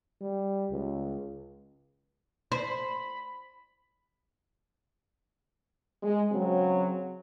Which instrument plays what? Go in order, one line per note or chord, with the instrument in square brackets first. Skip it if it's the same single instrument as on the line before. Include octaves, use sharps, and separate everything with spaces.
[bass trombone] G3
C#2
[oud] C5 [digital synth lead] B5
[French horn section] G#3
C#3 F#3 C4